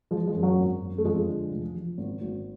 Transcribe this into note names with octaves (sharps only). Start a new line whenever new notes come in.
F3 G#3
F3 G#3
F#2
F#3
G#1
F#2
A3
F2 F3 G#3
D3
F1
F3
G#1
G#1